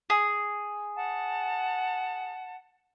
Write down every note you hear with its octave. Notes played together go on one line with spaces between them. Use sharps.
G#4
F#5 A5